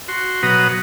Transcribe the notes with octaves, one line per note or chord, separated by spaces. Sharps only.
F#4 C6
B2 F#3 B4 F#5 A#5 D#6